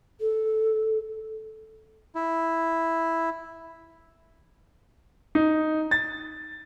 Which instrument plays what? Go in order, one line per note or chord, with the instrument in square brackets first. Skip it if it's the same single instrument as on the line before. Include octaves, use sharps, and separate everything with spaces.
[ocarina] A4
[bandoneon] E4
[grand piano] D#4
A6